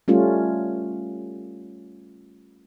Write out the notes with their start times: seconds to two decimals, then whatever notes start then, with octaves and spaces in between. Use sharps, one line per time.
0.08 G3 A3 C#4 F4